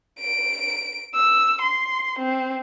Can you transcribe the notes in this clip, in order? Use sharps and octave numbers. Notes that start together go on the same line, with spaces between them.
D7
E6
C6
C4